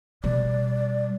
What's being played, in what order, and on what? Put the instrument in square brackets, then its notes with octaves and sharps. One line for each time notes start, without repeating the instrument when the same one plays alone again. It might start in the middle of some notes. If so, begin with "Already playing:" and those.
[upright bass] B2 G3 [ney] D5